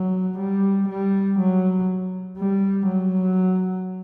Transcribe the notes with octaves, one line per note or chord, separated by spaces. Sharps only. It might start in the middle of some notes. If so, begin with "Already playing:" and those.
Already playing: F#3
G3
G3
F#3
G3
F#3